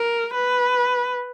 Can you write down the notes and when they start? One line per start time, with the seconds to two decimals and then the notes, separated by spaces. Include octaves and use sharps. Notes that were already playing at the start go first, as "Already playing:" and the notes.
Already playing: A#4
0.34 B4